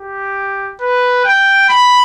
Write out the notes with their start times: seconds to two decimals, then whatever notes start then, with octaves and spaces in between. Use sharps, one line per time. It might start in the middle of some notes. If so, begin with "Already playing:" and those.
Already playing: G4
0.81 B4
1.25 G5
1.69 B5